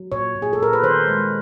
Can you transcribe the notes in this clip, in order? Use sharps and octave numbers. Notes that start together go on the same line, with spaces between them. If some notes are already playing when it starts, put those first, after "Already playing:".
Already playing: F#3
A#2 C#5
A#2
G#4
A4
A#2 A#4
B4
D#3 C5
G#3